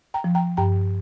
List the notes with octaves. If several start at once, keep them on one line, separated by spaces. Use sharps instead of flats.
G5 A#5
F3
G5 A#5
G2 G5 A#5